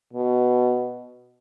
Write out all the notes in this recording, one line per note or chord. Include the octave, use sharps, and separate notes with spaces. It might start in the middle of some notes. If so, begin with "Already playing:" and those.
B2